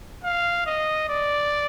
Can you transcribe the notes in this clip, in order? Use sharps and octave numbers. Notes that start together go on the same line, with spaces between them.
F5
D#5
D5